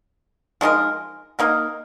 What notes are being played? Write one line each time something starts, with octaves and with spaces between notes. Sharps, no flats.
F3 G#3 D#4 A#4
A#3 D#4 A#4